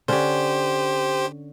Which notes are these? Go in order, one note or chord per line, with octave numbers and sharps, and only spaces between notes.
D3 C#4 G4 C5